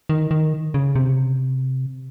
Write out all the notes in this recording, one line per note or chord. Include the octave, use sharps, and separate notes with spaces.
D#3
D#3
C#3
C3